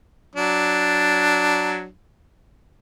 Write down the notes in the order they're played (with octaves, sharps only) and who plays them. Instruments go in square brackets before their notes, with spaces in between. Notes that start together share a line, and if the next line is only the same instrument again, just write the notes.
[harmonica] F#3 D4